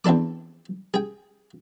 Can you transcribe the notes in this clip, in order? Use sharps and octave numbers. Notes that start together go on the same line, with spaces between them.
E2 C4 D4 A4 D6
G#4 G5